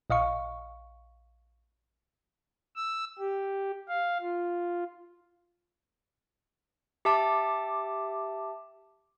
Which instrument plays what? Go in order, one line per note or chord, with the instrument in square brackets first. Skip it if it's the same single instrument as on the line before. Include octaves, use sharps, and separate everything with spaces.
[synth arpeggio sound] A#1 D#5 F5 C#6
[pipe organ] E6
G4
F5
F4
[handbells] G4 E5 A5 D6